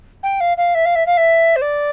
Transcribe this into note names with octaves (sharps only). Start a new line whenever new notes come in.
G5
F5
F5
E5
F5
E5
F5
E5
C5
D5